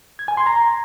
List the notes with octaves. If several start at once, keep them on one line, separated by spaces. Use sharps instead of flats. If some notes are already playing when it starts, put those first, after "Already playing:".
G#6
G#5
C6
A#5